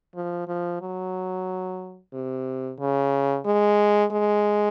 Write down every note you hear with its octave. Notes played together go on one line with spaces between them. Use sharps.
F3
F3
F#3
C3
C#3
G#3
G#3